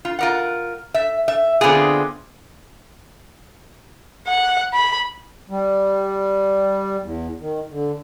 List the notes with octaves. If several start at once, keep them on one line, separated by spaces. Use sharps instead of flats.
F4
F4 A#4 F#5
E5
E5
D3 B3 C4 F4 G#4
F#5
B5
G3
E2
D#3
D3